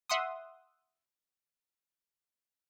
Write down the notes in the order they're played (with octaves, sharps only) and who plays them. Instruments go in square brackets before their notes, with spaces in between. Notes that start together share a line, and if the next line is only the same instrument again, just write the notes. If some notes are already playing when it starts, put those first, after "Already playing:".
[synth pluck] E5 F#5 C6 D#6